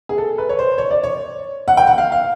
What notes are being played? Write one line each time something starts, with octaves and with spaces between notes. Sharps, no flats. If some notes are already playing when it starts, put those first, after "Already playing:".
G#4
A4
B4
C#5
C5
C#5
D5
C#5
F#5
G5
F#5
F5
F5